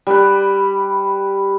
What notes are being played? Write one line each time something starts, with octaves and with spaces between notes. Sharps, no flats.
G3 B4